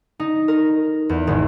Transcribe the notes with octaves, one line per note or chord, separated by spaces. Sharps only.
D#4
A#4
E2
G#1